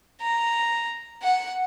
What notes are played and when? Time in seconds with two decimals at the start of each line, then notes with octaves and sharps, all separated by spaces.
0.21 A#5
1.23 F#5